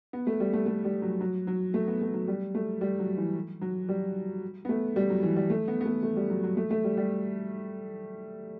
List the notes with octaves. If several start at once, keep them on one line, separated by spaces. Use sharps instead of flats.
B3
A3
G3
A3
A3
G3
F#3
F#3
F#3
A3
B3
A3
F#3
G3
A3
G3
F#3
E3
F#3
G3
B3
A3
G3
F#3
E3
G3
A3
B3
B3
A3
A3
G3
F#3
F#3
A3
A3
G3
G3